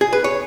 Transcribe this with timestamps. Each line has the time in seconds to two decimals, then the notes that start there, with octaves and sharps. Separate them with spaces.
0.01 G#4
0.13 B4
0.24 C#5